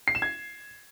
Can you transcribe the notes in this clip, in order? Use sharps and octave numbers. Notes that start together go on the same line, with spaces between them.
C7
E7
G#6